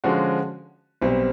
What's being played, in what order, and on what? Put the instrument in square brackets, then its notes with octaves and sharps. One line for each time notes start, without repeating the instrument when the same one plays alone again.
[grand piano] D3 F3 G#3 C#4 F#4
B1 B2 G3 C4